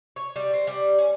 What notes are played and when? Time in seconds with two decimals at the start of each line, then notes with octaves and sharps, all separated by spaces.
0.16 C#5
0.36 G3
0.53 C4
0.67 G3
0.98 C#4